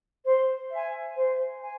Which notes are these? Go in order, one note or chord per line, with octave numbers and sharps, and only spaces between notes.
C5
E5 G#5
C5
G#5